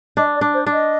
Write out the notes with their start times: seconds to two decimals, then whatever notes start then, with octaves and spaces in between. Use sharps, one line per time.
0.17 D4 D#5
0.36 D5
0.41 D4
0.54 C5
0.66 D4
0.72 D#5